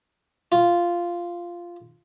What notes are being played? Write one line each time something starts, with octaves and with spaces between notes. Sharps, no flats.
F4